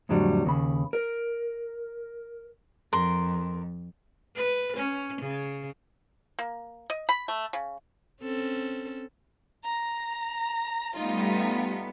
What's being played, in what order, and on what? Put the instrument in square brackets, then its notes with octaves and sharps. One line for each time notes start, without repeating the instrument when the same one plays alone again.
[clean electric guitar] F2 A2 D3 F#3 G3
D#2 C#3 B5
A#4
[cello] F2 [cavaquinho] A#4 C6
[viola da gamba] B4
C#4
C#3
[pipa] A#3
D#5
B5
A3
C#3
[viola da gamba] C4 C#4 A4
[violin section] A#5
[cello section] G3 A3 B3 [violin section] D#4 F4